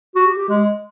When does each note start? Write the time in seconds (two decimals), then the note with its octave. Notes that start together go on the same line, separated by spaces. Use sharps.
0.16 F#4
0.27 G4
0.38 G4
0.49 G#3